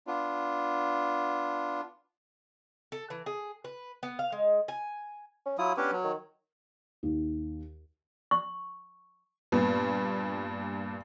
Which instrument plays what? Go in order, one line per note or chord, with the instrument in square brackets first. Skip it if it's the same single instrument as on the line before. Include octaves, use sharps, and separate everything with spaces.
[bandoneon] B3 D4 F4
[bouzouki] A4
E3
G#4
B4
B3
F5
G#3
G#5
[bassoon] C#4
[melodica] F#3 E4 D#6 [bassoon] F4
[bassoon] B3 [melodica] C#4 D4 G4
[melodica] F#3
[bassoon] D#3
[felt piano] D#2
[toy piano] C#6
[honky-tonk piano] G2 A#2 [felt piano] B3